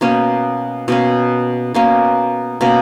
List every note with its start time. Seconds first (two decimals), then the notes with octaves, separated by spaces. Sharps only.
0.01 B2 A#3 C#4
0.88 B2 A#3 C#4
1.74 B2 A#3 C#4
2.61 B2 A#3 C#4